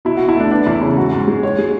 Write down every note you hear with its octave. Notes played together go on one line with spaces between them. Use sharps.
B2 E4
B2 F#4
E4
A3 D4
B3 D4
E2 E4
C#3 E4
G#2 F#4
G#2
G#3
C#5
G#3 F#4